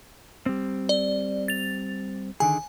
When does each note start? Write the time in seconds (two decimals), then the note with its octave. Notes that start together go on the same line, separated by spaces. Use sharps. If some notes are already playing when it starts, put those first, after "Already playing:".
0.46 G3 C4
0.89 D5
1.48 A6 F7
2.40 D3 D#3 G#4 G#5